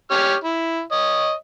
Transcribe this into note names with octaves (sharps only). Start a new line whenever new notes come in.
G4 C#5 F6
E4
C#5 D#5